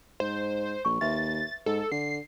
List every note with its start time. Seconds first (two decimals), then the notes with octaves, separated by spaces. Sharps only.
0.20 G#2 C5
0.85 A#1 C#6
1.01 D#2 B4 E5 C6 A6
1.66 G#2 A4
1.92 D3 C7